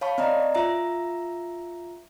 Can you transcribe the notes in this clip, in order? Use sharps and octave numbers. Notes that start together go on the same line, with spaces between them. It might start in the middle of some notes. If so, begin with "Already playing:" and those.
C#5 F5 A5 B5 C#6
C4 D5 D#5 A#5
F4 E5 A#5